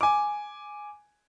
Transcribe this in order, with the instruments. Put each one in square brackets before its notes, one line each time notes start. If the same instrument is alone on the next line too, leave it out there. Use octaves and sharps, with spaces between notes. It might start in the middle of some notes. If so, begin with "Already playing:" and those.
[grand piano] G#5 D6